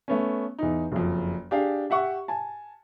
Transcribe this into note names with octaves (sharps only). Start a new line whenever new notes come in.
A3 B3 C#4
E2 D#4
F#1 F2
D4 G4 G#4 F5
G4 E5 F#5 C#6
G#5 A5